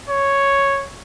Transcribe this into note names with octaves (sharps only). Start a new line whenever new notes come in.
C#5